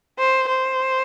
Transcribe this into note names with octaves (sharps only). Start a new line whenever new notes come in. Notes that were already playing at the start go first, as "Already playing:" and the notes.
C5
C5